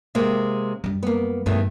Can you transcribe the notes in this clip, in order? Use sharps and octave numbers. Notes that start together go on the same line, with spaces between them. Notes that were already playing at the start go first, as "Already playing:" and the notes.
C3 G#3 A#3
F#2 G3
A#3 B3
G2 B2 D#3 A3